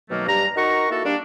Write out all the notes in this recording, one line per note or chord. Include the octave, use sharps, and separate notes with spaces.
B2 D#3 F#3 A3 A#3
G2 A#5
D#4 F#4 A#4 A#5 C#6
A#3 E4 F#4 A4
G3 A#3 D4